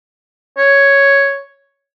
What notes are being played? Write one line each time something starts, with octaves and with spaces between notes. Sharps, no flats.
C#5